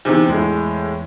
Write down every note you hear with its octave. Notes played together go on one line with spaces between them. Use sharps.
E2 C3 D#3
E2 A2 G#3